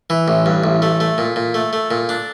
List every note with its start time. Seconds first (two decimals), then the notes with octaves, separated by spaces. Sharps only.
0.10 E3
0.28 A1
0.46 G2
0.64 A1
0.82 A3
1.00 A3
1.18 A#2
1.36 A#2
1.54 A3
1.73 A3
1.91 A#2
2.09 D4